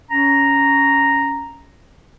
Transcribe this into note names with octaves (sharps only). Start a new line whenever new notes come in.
C#4 A#5